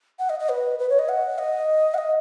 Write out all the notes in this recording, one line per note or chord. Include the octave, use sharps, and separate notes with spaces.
F#5
D#5
D#5
B4
B4
C#5
D#5
F#5
D#5
F#5
D#5